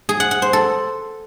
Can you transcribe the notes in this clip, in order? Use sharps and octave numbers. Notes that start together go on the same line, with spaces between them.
G#4
F#5
F#5
C5
A4